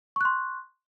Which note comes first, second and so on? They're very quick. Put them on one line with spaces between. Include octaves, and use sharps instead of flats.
C#6 F#6 C6